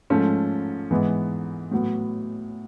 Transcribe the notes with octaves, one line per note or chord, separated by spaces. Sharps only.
G#2 F3 A3 C#4 F4
G#2 E3 G#3 B3
A2 F#3 B3